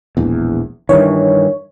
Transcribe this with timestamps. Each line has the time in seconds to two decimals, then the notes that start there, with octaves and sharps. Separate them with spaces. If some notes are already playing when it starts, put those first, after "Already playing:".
0.17 E1 A#1 E2
0.89 G2 D#3 E3 C#5